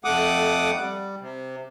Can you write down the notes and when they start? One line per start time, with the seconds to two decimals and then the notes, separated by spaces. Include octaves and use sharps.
0.05 F2 A3 F#5 D6 D#6
0.78 G3
1.21 C3